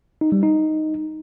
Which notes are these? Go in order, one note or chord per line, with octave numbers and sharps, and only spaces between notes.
D#4
G3
D#4